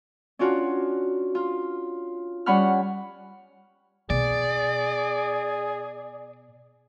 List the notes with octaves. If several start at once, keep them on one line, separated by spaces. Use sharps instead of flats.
C#4 D4 F4 F#4
F4
G3 C#4 F#5 B5 C#6 F6
B2 G#4 D5